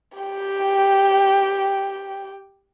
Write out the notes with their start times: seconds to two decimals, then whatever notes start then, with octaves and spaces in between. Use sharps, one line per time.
0.18 G4 G5